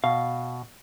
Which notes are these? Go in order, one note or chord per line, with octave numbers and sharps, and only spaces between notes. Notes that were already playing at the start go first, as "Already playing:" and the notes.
B2 F5